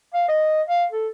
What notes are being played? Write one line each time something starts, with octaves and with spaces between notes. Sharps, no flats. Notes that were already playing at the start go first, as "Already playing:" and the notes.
F5
D#5
F5
A4